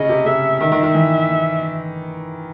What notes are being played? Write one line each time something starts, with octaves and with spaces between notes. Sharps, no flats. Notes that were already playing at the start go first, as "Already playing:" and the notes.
Already playing: C#3 D#5
C3
C#3 E5
D#3 E5
D#3
D#3
E3